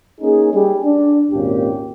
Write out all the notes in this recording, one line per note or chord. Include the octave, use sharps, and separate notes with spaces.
A#3 C#4 D#4 G#4
G3 G#4
D4
G#1 D#2 A#2 A#3 C#4 G4